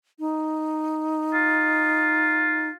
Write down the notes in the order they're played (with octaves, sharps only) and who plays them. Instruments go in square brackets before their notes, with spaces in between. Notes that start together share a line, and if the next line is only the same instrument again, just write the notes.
[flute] D#4
[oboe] F4